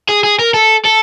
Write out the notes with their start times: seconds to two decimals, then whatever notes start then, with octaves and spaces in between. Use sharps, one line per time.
0.09 G#4
0.24 G#4
0.39 A#4
0.54 A4
0.85 A4